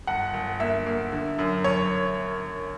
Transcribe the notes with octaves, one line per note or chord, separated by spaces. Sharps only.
G1 F#5
G1
A#3 E5
A#3
D3
F#2
F#2 C#5